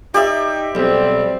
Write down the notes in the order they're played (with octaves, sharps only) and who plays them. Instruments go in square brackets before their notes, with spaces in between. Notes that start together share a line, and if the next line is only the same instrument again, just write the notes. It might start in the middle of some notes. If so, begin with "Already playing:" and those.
[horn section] D#4 [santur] G4 E5 [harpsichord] D5
[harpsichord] B1 [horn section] F#3 G3 D5 [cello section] C4